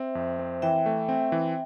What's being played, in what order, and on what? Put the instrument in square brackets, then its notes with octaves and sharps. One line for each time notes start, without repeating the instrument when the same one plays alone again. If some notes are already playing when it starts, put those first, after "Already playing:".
Already playing: [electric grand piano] C4 [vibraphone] C5 E5
[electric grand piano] F2
C4
[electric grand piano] E3 [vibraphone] E5 G5
[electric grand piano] A3
C4
E3